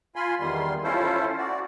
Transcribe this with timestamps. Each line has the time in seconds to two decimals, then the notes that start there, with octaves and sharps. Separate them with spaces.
0.16 F4 G#5 B5 C6
0.40 E2 D#3 G3 C6
0.84 C#4 E4 F4 A4 C5
1.37 F#4 D5